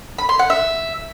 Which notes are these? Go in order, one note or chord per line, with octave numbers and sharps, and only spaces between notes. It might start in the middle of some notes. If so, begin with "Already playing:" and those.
B5
C6
F#5
E5